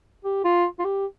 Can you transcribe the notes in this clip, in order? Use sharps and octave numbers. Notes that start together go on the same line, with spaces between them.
G4
F4
F4
G4